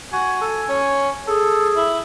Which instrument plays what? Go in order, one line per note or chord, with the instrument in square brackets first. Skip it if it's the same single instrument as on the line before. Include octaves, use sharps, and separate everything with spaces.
[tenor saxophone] F#4 [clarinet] G#5
[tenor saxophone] A4
C#4
[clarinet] G#4 [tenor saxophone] A4
[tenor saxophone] E4